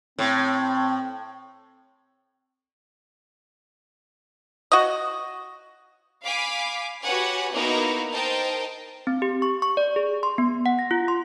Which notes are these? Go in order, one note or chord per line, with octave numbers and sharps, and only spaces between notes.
A2 C4
F#4 D#5
F5 G#5 B5 D6 B6
F#4 G4 B4 C#5 F#5 G#5
A#3 B3 D#4 E4 F#4 A#4
D#4 A#4 C5 D#5 G5 A5
C4
G4
C#6
C#6
D5
G#4
C6
B3
F#5
A#6
F4
C6